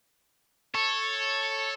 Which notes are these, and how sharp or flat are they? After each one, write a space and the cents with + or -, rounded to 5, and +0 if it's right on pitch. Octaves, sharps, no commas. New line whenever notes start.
A4 +0 C#5 -5